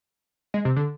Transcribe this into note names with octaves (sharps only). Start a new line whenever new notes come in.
G#3
C3
D3